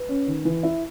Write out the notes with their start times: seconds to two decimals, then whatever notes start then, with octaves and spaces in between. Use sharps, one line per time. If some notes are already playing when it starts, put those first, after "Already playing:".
Already playing: B4
0.09 C#4
0.27 D#3
0.45 E3
0.63 E4